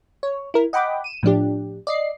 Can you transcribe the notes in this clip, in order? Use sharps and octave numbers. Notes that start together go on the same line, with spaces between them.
C#5
E4 A#4
D#5 F#5 G5 B5 D6
D#7 E7
A2 F3 D4 G4
D5 D#5 C7